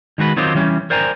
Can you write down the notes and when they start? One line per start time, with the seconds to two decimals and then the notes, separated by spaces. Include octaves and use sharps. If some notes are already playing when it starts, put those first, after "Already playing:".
0.18 D#3 G#3 F#4 B4
0.37 D#3 F#3 C4 D#4 F4 G4
0.55 E3 G3 C#4 G4
0.90 A#4 C5 D5 G5 G#5 A#5